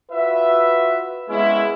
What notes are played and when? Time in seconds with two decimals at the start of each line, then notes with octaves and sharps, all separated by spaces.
0.12 F4 F#4 B4 E5
1.29 G#3 A#3 B3 C#4 E4